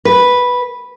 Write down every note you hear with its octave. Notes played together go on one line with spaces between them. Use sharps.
B4